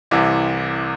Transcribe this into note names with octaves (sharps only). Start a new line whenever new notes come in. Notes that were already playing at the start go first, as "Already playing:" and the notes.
C2 C3 E3